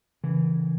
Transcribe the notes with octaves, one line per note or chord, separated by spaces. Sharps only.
C#3 E3